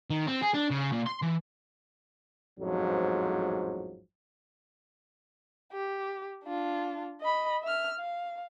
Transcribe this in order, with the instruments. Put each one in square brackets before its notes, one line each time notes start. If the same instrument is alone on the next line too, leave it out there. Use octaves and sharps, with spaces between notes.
[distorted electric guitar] D#3
C4
G#4
D4
C#3
A#2
C6
E3
[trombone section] A1 F2 G#2 F3 F#3
[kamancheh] G4
D4 F4
D#5 B5
E5 F6
F5